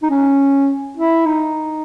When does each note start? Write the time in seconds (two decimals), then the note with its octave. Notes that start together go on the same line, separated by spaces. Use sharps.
0.03 D#4
0.10 C#4
0.97 E4
1.26 D#4